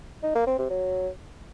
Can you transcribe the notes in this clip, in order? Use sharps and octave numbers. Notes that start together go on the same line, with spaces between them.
D#4
A#3
C4
C3
F#3